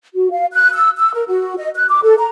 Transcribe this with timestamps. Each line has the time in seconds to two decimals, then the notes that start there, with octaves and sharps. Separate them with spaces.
0.14 F#4
0.31 F5
0.52 F#6
0.74 E6
0.98 E6
1.15 A#4
1.28 F#4
1.58 D#5
1.75 F#6
1.90 D6
2.03 A4
2.18 A#5